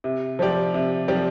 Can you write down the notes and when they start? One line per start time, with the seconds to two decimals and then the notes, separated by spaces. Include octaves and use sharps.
0.04 C3
0.39 F3 C4 G4 D5
0.74 C3
1.08 F3 C4 G4 D5